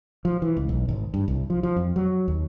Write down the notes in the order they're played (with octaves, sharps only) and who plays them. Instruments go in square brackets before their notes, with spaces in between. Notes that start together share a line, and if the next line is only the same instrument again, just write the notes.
[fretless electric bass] F3
E3
C#2
B1
G#1
G2
C2
F3
F3
F2
F#3
D#2